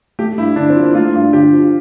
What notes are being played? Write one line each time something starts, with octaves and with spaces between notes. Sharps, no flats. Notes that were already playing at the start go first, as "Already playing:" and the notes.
A3 G4
G2 E4
D3 D4
C4
F3
A#3
A3 F4
G2
D3 G4
F3